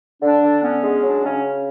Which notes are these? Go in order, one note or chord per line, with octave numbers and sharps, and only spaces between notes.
D3 D4
D3
B3 C#4
G#3
F#3 D4
C#3 C#4